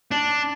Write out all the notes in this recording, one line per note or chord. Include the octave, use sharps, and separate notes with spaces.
D4